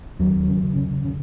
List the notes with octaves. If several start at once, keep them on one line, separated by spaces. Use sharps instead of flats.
D#2 F#3
C#3
C#3
C#3